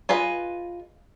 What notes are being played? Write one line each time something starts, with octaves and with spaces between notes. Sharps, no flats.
F4 G#4 B4 D#5